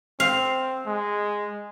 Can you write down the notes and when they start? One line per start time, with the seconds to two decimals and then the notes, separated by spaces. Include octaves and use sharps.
0.20 C4 F5
0.86 G#3